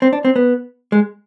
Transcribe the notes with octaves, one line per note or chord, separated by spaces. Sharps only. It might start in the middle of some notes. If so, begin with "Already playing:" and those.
C4
D4
C4
B3
G#3